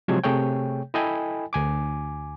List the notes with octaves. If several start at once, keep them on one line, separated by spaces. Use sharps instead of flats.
C3 F3 F#3 G#3 C5 G#6
C3 A3 G#4 C#5 G5
E4 A4 D#5 G5 G#5 B5
D2 G#5 D6